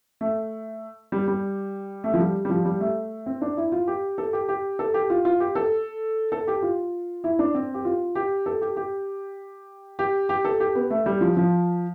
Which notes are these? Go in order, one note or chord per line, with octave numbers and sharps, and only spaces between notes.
A3
G3
G3
A3
F3
G3
G3
F3
G3
A3
C4
D4
E4
F4
G4
A4
G4
G4
A4
G4
F4
F4
G4
A4
A4
G4
F4
E4
D4
C4
G4
F4
G4
A4
G4
G4
G4
G4
A4
G4
B3
A3
G3
F3
F3